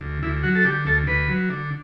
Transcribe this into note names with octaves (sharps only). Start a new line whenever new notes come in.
D2
D2 E4
F#3 F#4
A4
D3 G4
D2 A4
D2 B4
F#3
D3